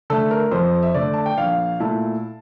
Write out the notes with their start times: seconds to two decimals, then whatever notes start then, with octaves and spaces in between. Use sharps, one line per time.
0.10 D3 A3 A4
0.31 A#4
0.52 F2 C5
0.83 E5
0.94 D3 A3 D5
1.14 A5
1.26 G5
1.38 A#1 F5
1.80 A#2 A3 E4 A5